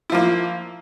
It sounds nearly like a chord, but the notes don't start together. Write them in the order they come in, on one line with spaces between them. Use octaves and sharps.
E4 F3 A#3